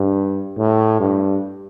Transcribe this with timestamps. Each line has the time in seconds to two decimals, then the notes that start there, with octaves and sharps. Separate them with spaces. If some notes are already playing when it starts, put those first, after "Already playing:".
Already playing: G2
0.57 A2
1.00 G2